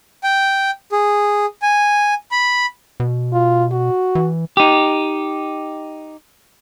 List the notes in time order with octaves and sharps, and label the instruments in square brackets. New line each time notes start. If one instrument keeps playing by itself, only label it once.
[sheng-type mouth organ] G5
G#4
G#5
B5
[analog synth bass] B2
[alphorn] F4
F#4
[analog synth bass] E3
[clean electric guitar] D#4 G4